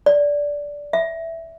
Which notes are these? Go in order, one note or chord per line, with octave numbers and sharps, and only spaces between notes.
D5
E5